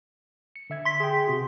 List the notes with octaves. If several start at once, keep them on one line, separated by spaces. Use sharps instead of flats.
C#7
D3 E5 G#6
C6 B6
G#4 G5
C3 F#4